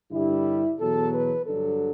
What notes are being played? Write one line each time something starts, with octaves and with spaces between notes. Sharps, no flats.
G2 D3 G3 E4
E2 B2 F#3 A4
B4
G2 D3 F#3 A4